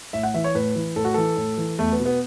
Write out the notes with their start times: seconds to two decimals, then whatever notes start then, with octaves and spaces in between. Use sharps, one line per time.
0.13 A2 E5
0.23 F#5
0.34 E3 E5
0.44 C#5
0.55 A2 B4
0.76 E3
0.96 A2 A4
1.05 F#4
1.14 E3 A4
1.37 A2
1.58 E3
1.79 E2 A3
1.93 B3
1.99 B2
2.06 B3